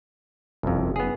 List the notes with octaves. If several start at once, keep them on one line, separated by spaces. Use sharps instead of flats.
F#1 C2 F2
B3 G#4